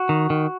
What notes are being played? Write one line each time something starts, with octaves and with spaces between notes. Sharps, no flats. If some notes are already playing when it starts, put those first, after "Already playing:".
Already playing: F#4
D#3
D#3